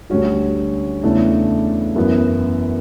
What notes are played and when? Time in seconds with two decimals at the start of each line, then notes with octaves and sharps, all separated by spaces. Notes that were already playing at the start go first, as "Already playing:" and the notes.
0.10 D2 D3 G3 C#4 F#4
1.03 E2 C#3 E3 A3 D4
1.96 F#2 E3 B3